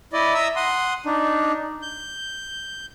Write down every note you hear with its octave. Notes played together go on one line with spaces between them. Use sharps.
E4 D5 D#5
E5 A#5 D#6 E6
F#5 C6 D#6
D4 D#4
G6